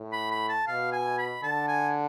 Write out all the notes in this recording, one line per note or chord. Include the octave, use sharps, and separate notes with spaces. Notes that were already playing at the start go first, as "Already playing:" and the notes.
Already playing: A2
B5
B5
A5
B2 F5
G#5
B5
D3 A5
G#5